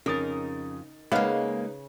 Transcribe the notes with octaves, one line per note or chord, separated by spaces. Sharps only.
F2 C#3 D#4 A#4 D#6 A6
C#3 G#3 A#3 B3 D#4 B4 F5